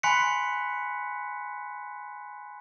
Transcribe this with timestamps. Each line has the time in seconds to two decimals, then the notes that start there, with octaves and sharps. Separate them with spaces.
0.03 G#5 B5 C6 F#6 B6 C#7